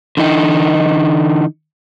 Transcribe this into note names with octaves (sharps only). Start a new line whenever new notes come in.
D3 E3 D#4